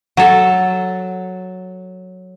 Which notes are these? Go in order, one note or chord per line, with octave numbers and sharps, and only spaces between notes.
F#3 A4